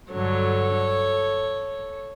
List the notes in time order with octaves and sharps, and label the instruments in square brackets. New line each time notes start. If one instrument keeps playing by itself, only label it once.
[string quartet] G2 D3 F#3 A4 C#5